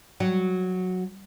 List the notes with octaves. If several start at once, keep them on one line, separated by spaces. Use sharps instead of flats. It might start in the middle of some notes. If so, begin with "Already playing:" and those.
F#3